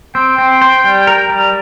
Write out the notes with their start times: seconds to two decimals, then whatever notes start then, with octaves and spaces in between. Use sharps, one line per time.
0.15 C4 G5
0.38 C4
0.62 C5
0.84 G3
1.07 A#4
1.30 G3